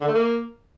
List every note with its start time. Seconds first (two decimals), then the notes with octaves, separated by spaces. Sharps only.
0.01 D3
0.08 A3
0.15 A#3